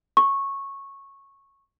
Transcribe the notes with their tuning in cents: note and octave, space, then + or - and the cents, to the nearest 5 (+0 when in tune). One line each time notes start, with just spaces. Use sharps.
C#6 -10